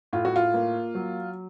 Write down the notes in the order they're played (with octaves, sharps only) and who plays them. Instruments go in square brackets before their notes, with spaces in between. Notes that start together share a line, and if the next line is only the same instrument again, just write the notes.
[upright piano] A2 F4
F#4
F4
A#3
F#3